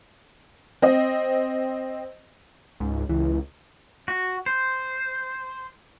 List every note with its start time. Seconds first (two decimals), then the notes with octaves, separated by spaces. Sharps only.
0.82 C4 D#5
2.80 C#2 G#2
3.09 C#2 E3
4.08 F#4
4.46 C5